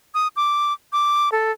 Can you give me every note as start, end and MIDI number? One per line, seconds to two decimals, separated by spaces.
0.15 0.28 87
0.36 0.73 86
0.92 1.29 86
1.32 1.52 69